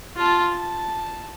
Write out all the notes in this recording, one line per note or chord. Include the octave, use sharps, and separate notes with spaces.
F4 A5
A5